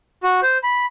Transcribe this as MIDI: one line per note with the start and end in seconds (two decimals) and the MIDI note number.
0.23 0.41 66
0.43 0.58 72
0.63 0.86 83